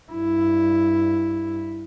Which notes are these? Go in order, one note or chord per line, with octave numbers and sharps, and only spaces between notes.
G2 E4